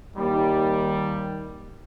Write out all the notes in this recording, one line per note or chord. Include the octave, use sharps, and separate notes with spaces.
D#2 D#3 G3